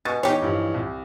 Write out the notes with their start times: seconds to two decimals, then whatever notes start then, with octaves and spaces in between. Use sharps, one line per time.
0.05 B2 G#5 C#6 A6
0.23 E2 D#4 G4 C#5
0.42 G2 E3 F3
0.74 C2